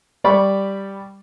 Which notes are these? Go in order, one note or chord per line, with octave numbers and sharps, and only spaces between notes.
G3 D5 B5 C#6